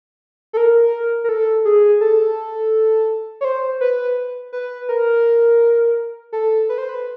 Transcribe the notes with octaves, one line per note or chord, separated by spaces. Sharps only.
A4
A#4
A#4
A4
G#4
A4
C#5
C5
B4
B4
A#4
A4
B4
C5
B4